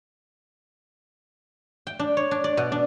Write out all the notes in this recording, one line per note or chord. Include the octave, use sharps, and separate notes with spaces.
G5
D4
C#5
D4
D5
B2
D4